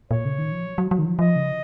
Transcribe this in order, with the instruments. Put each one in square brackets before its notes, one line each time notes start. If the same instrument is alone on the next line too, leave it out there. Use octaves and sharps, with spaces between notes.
[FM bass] A#2 [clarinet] C#5
[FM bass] C#3
D#3
F3
F#3
F#3
F#3
D#3
F3
[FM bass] F3 [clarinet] D#5
[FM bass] C#3